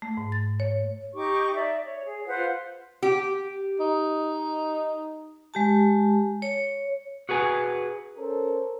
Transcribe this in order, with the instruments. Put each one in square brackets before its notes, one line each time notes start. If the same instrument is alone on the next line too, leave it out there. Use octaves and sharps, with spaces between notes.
[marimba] A3
G#2
A6
C#5
[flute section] D#4 G4 C#6 D6
D5 E5
C#5
G#4
F4 B4 C5 F#5
[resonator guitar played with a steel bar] G4
[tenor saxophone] D#4
[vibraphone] G#3 G4 A5
C#5
[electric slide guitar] F#4 G#4 B4 G#5
[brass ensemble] C#4 A4 A#4 C5